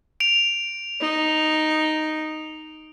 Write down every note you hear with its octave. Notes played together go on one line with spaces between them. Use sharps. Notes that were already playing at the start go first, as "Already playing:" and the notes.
D7 F7
D#4